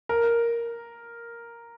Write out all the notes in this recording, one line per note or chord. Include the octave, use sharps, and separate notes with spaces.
A#4